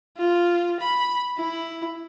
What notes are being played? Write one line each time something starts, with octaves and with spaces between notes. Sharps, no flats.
F4
B5
E4